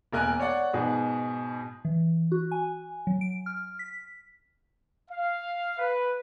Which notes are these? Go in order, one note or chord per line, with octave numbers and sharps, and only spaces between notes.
E1 A#3 A#4 G#5 F#6
C#5 D5 F#5
G#2 B2 G#4
E3
F#4
G#5
F#3
D7
F6
B6
F5
B4